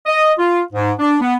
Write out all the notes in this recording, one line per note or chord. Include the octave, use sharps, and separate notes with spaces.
D#5
F4
G#2
D4
B3